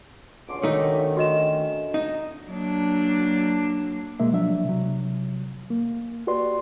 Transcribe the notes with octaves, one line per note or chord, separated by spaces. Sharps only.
C#2 B2 D3 C#4 C6 D6
D#3 A3 D#4
F#4 D#5 E7
D#4
F#3 A#3 D4
B2 G#3 A#3 E5
F3 F#3 D4 E5
C3 F#3
A#3
F#4 G4 B4 D5 C6